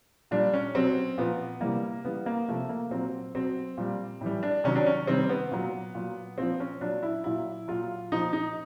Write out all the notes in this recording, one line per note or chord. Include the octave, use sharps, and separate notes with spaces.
A#2 G3 D4
C#4
B2 F#3 C4
A#2 F3 B3
C3 E3 G3 A#3
C#3 E3 G3 B3
A#3
C3 F3 A3
A#3
A#2 F#3 C4
B2 F#3 C4
A#2 G3
A2 E3 G3
D4
C3 D#3 F#3 C#4
D4
C#4
C3 D#3 G3 C4
B3
A#2 F#3
A#2 F#3
A#2 F3 C4
C#4
A#2 F#3 D4
E4
A#2 F#3 E4
A#2 F#3 F4
A#2 F3 D#4
D#4